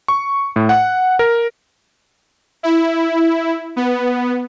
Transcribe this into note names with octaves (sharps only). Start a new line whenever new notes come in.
C#6
A2
F#5
A#4
E4
B3